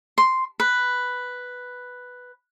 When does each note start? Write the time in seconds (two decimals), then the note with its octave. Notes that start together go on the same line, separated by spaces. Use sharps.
0.18 C6
0.60 B4